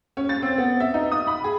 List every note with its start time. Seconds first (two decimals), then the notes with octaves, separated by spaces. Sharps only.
0.17 C#4
0.29 A6
0.42 C4
0.58 B3
0.80 E5
0.94 D#4
1.12 D#6
1.27 B5
1.44 G#4